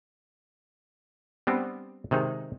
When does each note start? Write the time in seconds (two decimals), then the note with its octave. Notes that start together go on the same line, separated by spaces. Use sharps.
1.47 G3 B3 C4 D4
2.11 C3 D#3 G#3 D#4